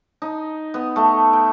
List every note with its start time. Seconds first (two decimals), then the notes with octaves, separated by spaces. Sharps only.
0.22 D#4
0.74 B3
0.96 A3
1.33 G5